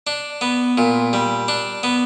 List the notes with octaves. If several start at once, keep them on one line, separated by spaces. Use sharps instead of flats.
D4
B3
A#2
G3
D4
B3